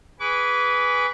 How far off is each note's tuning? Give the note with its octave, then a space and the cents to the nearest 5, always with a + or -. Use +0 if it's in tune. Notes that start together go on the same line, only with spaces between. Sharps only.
G#4 -10 B4 +0 D6 -40